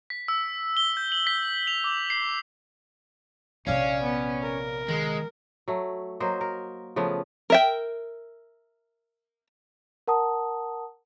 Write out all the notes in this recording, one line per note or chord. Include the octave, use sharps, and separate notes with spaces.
B6
E6
G7
G6
F#7
B6
F7
D6
C7
A#1 C3 C#4 C#5 D5 F5
B3
A#4
D#3 G#3
F#3 A3
F#3 A#3 C5 D#5
A#4
C#3 F3 A3 B3
A#4 E5 G5
A#4 F#5 A5 A#5 D#6